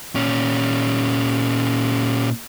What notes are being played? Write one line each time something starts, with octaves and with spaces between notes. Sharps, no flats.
A#2 C#4